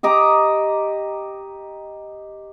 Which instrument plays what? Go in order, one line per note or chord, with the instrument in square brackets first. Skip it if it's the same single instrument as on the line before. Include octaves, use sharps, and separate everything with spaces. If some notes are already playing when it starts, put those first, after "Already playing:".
[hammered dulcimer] G4 D#5 A#5 D6